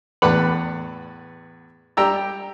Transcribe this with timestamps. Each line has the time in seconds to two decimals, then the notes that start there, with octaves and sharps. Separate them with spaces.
0.22 E2 A2 B4 D5 F#5 B5
1.97 G3 G4 G5 A#5 E6